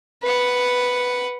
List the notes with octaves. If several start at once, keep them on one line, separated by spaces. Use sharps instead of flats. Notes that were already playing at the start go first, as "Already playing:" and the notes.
B4 F#5